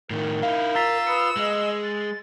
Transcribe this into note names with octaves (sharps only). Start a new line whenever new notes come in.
A2 D#3 A#4
D#4 E4 F5
F4 A#5 E6 A6 B6
B4 B5 D#6 C#7
G#3 D#5
A6